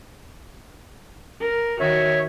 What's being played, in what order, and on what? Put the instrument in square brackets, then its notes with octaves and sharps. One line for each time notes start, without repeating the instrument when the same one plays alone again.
[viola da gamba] A#4
[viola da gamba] D#3 F#4 [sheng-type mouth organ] C#5 E5